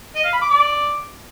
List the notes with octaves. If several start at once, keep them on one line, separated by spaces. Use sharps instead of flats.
D#5
F5
B5
D6
D5